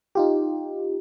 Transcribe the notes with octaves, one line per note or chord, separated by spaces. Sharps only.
D#4 F4 G4